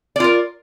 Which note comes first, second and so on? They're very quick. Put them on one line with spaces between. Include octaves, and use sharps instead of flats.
D5 F4 A#4